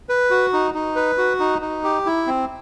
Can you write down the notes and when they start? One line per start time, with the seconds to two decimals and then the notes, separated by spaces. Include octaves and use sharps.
0.09 B4
0.30 F#4
0.53 D#4
0.74 D#4
0.96 B4
1.18 F#4
1.40 D#4
1.62 D#4
1.84 G4
2.06 E4
2.27 C4